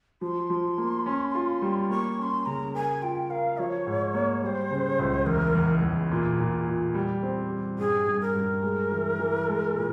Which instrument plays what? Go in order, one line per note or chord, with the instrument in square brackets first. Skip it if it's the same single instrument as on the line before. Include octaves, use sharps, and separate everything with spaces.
[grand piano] F3 [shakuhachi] C6
[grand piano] F3
A#3
C#4
F4
G3
[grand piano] A#3 [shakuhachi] C#6
[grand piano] C#4 [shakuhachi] C6 C#6
[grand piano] C#3 [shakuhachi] A#5
[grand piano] A#4 [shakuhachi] G#5
[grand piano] F4 [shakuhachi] G5
[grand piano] A#4 [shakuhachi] F5
[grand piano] F3 [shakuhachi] C#5
[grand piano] G#2
A#3
[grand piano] G3 [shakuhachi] C5 C#5
[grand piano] C#3
C#2
[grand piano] E2 [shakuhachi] A#4
[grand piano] E2
E2
A#2
A#2
A#2
G3
C4
G3
[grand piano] G2 [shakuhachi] G#4
[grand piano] G2
[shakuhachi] A#4
[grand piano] G2
G#3
E3
E3
G#3
A#2